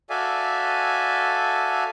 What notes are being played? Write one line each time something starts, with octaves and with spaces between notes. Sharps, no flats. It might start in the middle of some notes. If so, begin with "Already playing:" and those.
F#4 A4 D5 E5 F5 G#5